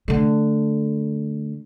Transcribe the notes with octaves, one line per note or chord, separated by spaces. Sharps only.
D3 A3